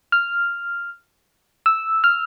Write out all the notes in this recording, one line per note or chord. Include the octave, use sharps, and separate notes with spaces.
F6
E6
F6